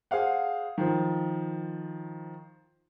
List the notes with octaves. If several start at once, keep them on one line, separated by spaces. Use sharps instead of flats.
G#4 C5 F5 F#5
D#3 F3